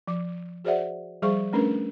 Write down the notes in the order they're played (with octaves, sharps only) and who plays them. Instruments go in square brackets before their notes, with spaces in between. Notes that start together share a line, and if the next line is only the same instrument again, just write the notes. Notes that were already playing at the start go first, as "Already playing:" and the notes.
[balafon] F3 D6
F#4 G#4 C5 D5 E5 F#5
F3 G3 G#4 C5 F5 C#6
A3 C#4 D4 A#4 B4